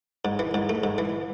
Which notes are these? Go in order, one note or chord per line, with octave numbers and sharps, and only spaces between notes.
G#2
E3
G#2
A3
G#2
E3